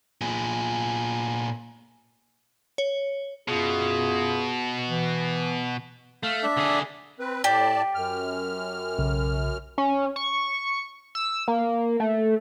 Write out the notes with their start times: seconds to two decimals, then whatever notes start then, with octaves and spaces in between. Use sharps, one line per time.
0.21 A#2 G#4
2.78 C#5
3.48 F#2 B2 F4 G#4
4.87 E3
6.23 A3 F5
6.43 D4 E5
6.57 D3 G#4
7.19 C4 B4
7.44 A2 G4 D5 A5
7.95 F#2 F6
8.98 B1 C#3
9.78 C#4
10.16 C#6
11.15 E6
11.48 A#3
12.00 A3